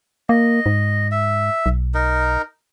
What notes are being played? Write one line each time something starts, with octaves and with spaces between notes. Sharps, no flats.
A#3 D#5
G#2
E5
B1
D#4 A#4